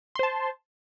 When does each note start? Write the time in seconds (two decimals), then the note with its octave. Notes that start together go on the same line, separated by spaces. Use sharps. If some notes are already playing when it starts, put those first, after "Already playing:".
0.15 C6
0.19 C5
0.23 A5